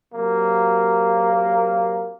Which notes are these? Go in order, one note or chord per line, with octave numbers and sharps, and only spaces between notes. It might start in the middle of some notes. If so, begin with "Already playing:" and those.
C3 F#3 A#3